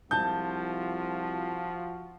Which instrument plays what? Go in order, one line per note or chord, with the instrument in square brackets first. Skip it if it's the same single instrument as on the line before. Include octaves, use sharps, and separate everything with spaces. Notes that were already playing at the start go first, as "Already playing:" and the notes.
[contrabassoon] C2 [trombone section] F3 F4 F#4 [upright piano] A5 G6